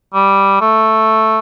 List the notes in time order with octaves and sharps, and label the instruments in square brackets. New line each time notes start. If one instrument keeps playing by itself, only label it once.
[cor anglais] G3
A3